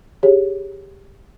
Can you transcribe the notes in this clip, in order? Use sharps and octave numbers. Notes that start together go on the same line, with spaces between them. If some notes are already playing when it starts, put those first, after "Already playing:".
G4 G#4 C#5